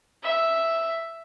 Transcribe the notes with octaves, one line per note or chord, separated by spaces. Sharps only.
E5